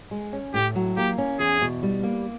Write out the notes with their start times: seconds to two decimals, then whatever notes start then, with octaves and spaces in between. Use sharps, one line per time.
0.11 G#3
0.33 C#4
0.54 A2 G4
0.75 F#3
0.97 A#3 G4
1.18 C#4
1.39 E2 G#4
1.62 B2
1.83 G3
2.03 A#3